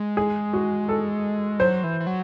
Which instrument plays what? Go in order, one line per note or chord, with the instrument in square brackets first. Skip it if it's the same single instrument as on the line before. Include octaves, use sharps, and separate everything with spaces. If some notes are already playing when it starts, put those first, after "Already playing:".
Already playing: [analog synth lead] G#3
[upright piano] G#4
F#4
A4
[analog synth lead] F#3 [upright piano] C5
[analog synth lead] E3
E3
F#3